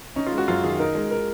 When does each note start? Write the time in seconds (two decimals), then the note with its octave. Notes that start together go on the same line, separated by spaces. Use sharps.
0.16 C#4 D#4
0.26 F4
0.32 G#3
0.38 F#4
0.48 F#2 F4
0.64 D#3 G#4
0.79 D#4 A#4
0.95 G#3
1.11 A#4